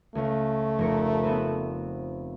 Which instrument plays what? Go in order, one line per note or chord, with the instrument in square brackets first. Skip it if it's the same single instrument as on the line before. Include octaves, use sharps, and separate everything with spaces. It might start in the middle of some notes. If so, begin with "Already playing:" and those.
[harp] C#2 C#4 [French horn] A3
[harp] F1 A#4 C#7
B3 C4 B4